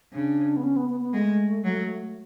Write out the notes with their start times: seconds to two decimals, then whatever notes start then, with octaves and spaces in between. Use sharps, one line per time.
0.13 C#3 D4
0.57 B3
0.63 C#4
0.76 B3
0.89 B3
1.01 B3
1.13 G#3 A3
1.64 F#3